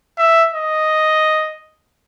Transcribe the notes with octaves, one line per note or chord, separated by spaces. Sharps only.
E5
D#5